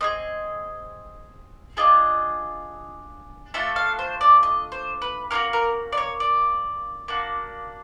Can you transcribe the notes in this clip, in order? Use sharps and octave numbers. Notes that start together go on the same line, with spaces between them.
C4 D#4 G#4 D#5
D4 F4 G#4 D#5
A3 D4 F4 A4 E5
F5
C5
D5
D#5
C5
B4
A#3 C#4 F#4 A#4
A#4
D5
C#5
D5
A#3 D4 F#4